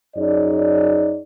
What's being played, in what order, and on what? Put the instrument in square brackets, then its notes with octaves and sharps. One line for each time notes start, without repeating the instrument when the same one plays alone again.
[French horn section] F#2 D#4 G#4 C#5 D5